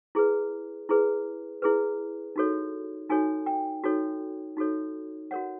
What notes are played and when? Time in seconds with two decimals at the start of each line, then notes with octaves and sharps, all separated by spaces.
0.15 E4 G#4 B4
0.89 E4 G#4 B4
1.62 E4 G#4 B4
2.36 D#4 F#4 A4 C#5
3.10 D#4 F#4 A4 C#5 G#5
3.46 G5
3.84 D#4 F#4 A4 C#5
4.57 D#4 F#4 A4 C#5
5.31 F#4 A#4 C#5 F#5